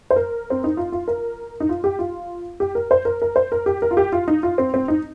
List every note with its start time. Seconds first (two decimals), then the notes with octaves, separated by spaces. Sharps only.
0.10 C5
0.16 A#4
0.50 C4
0.64 D#4
0.77 F4
0.92 F4
1.08 A#4
1.60 D#4
1.69 F4
1.84 G4
1.99 F4
2.60 G4
2.75 A#4
2.91 C5
3.05 A#4
3.22 A#4
3.36 C5
3.52 A#4
3.66 G4
3.82 A#4
3.91 F4
3.97 G4
4.12 F4
4.28 D#4
4.43 F4
4.58 C4
4.74 C4
4.88 D#4